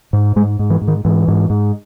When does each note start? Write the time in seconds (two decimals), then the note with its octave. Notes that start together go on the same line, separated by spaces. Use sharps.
0.13 G#2
0.36 G#2 G#3
0.59 G#2
0.70 E3
0.81 G#2
0.88 D#3
1.05 G#2 E3
1.28 G#2
1.50 G#2